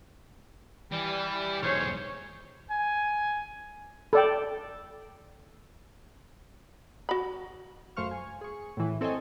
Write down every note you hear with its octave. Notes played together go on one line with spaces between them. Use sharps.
E3 G3
B1 E2 G#4 C5 C#5
G#5
A4 D5 G5
F#4 B5
F#2 A3 C5 F5 C#6 F6
G#5
G#4 C#6
A2 E3
C4 A4 C#5 D#5 G#5